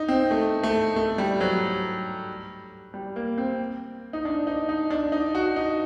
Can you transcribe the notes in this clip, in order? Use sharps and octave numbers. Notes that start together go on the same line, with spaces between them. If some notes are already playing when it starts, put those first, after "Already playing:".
Already playing: D#4
C4
A3
A3
A3
G3
F#3
G3
A#3
C4
D#4
D4
D#4
D#4
D4
D#4
F#4
D#4